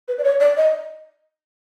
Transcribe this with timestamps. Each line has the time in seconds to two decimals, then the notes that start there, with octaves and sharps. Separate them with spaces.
0.08 B4
0.18 D5
0.24 C#5
0.40 D5
0.57 D#5